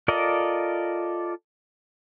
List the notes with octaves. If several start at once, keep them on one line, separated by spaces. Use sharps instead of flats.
F4 A4 A#4 D5 D#5